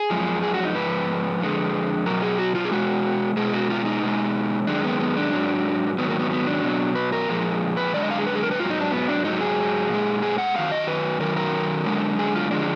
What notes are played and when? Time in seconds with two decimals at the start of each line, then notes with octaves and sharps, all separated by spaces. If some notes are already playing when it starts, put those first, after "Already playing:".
Already playing: G#4
0.10 F#2 F3 G#3
0.43 G#4
0.54 F#4
0.65 D#4
0.75 G#2 F3 B4
1.41 F2 D3 G#3
2.06 B2 F#3 A#4
2.22 G#4
2.38 F#4
2.55 F4
2.65 G#4
2.72 B2 G#3 F#4
3.37 B2 G#3 G#4
3.54 F#4
3.70 F4
3.85 D#4
4.02 B2 G#3
4.67 F#2 D#3 G#3 D4
4.84 B3
5.00 B3
5.17 D4
5.33 G#2 F#3
5.98 G#2 D#3 F#3 B3
6.09 A#3
6.19 B3
6.31 B3
6.47 D4
6.63 B2 F#3
6.95 B4
7.12 A#4
7.29 A#2 F3 G#3
7.77 B4
7.94 F#2 D3 G#3 D5
8.02 D#5
8.11 F5
8.18 G#4
8.26 B4
8.35 G#4
8.43 A#4
8.51 B4
8.59 G#2 F#3 F4
8.70 D#4
8.81 D4
8.92 B3
9.08 D4
9.24 G#2 F#3 D#4
9.41 G#4
9.89 A#2 G#3
10.22 G#4
10.38 F#5
10.55 F#2 D#3 F#3 F5
10.71 D#5
10.88 B4
11.21 F#2 D#3 F#3 A#4
11.37 A#4
11.86 F#2 D3 G#3
12.19 G#4
12.35 F4
12.51 D3 F3 G#3 D4